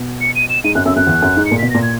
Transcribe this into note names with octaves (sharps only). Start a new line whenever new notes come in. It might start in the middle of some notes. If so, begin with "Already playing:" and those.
Already playing: B2
C#7
D#7
E7
G#2 D#7
F#2 F#6
F#2 E6
F#2 F#6
E2
F#2
G#2
C#7
A#2
B2 B6
A#2 A#6
G#6